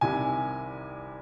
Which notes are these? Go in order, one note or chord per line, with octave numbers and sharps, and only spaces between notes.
C2 C3 D#3 G3 G#5